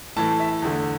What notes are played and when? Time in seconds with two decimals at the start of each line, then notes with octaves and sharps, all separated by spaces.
0.17 A2 E3 A3 A5
0.40 E5
0.62 E2 D3 A3